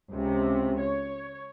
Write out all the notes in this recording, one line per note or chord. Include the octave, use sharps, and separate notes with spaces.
C#2 C3
C#5